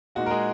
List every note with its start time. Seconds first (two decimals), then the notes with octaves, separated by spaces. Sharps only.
0.15 A#2 G#3 D#4 F#4
0.26 A#4
0.30 G#3 G#4